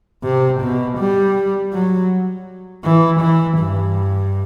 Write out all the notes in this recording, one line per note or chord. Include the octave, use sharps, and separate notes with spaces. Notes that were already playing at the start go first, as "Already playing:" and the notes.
C3
B2
G3
F#3
E3
E3
G2